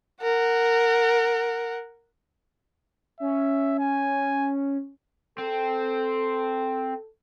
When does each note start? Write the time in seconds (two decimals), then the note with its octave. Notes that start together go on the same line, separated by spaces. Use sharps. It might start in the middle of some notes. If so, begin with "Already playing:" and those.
0.22 A#4 F#5
3.20 C#4 E5
3.79 G#5
5.38 C4 A4